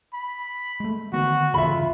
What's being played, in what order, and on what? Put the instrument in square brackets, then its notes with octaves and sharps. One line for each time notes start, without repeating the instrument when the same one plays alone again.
[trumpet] B5
[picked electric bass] G#3 A3
[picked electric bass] D3 D#3 B3 [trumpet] F#4
[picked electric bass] G1 E2 C#3 [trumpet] F4 [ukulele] E5 B5